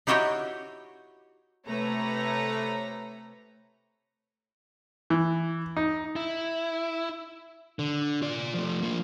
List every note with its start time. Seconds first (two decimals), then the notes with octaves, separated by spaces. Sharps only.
0.07 D#4 E4 F#4 G4 C#5 D#5
1.67 C3 A3 B4 C#5 A#5
5.10 E3
5.77 D#4
6.16 E4
7.79 D3
8.22 F4 D5
8.54 F3 A3
8.82 F3 A#3